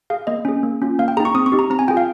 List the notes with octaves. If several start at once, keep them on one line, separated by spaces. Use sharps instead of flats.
G#4 F5
A#3 D#5
C#4 G#4
A#3
C#4 F4
A#3 F5
G5
D#4 G#4 A#5
C#6
C4 D#6
C#6
D#4 G4
A#5
C4 A#5
G#5
F4 G#4 G5
F5